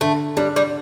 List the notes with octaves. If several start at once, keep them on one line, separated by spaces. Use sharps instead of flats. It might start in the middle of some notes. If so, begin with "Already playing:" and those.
D3 A3
G3 D4
G3